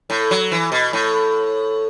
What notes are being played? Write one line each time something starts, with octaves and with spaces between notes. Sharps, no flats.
A2
F#3
E3
B2
A2